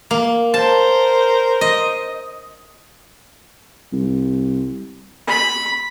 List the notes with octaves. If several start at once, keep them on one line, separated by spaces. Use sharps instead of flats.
A#3
A#4 C5 A5
D#5
C2
B5